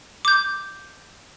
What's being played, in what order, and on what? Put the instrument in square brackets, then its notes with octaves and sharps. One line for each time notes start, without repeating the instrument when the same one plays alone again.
[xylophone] D6 G6